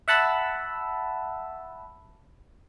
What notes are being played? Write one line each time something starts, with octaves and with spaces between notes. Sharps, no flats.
E5 F#5 A5 B5 E6